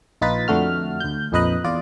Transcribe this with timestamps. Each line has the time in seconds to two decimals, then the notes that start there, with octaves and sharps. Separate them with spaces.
0.21 A#1 D#4 F4 B4 A6 B6
0.48 F2 D3 A3 F#4 F6
1.00 D2 G6
1.32 A#1 F2 D#4 B4 D#5 F#6
1.64 E2 F4 D5